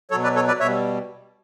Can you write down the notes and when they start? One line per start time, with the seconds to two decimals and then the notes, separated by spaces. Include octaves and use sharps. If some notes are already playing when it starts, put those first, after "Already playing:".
0.11 B2 F#3 A4 C#5
0.23 B4 D5
0.36 A4 C#5
0.47 B4 D5
0.59 B2 C#5 E5
0.64 G3